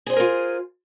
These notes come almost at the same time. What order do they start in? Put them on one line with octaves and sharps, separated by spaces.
G#4 C5 G#5 A#4 F4